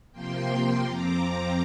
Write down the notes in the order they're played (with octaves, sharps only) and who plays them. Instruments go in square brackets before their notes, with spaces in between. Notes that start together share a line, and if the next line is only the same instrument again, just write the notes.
[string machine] C3 F3 A#3 G5 C6
F2 F3 C4 A#5 D6
A#5 D6